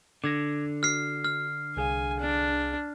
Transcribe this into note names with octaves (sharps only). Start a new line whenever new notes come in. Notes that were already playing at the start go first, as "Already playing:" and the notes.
D3 D6 G#6 A#6
F#4 F6 C7
F6
C2 G#4 F5 G#5
D4